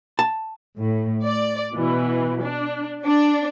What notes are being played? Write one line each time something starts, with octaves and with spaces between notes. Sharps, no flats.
A5
A2
D5
B2 E3
D4
D4